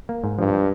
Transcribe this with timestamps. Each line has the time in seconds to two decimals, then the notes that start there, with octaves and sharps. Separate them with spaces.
0.09 A#3
0.24 G#2
0.39 G2 F3